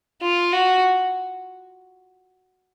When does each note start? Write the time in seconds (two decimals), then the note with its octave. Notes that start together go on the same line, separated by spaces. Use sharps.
0.22 F4
0.53 F#4